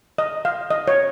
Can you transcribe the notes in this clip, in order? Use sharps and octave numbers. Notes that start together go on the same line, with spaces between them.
D#5
F5
D#5
C#5